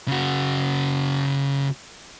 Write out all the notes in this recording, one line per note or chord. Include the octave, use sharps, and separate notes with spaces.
C#3 F#4